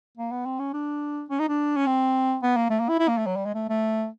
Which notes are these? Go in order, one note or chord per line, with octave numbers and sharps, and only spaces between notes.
A#3
B3
C4
C#4
D4
C#4
D#4
D4
C#4
C4
B3
A#3
A3
A#3
E4
E4
A#3
A3
F#3
G3
G#3
A3
A3